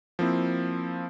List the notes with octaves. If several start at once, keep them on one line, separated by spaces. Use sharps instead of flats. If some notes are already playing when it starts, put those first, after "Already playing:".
F3 A#3 C4 E4